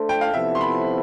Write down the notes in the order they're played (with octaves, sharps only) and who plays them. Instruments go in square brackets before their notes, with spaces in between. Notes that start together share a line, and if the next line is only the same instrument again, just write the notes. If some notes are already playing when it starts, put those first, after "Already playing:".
Already playing: [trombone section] A3 D4 A4 C5
[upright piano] G5
F5
[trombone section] C3 F3 B3 E4 A4 [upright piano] E5
[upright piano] C6
B5